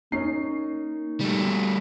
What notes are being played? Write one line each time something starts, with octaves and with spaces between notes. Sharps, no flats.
A#3 C#4 D#4 C7
G3 A3